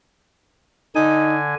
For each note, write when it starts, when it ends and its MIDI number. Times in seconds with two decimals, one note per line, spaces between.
0.95 1.55 50
0.95 1.37 63
0.95 1.55 80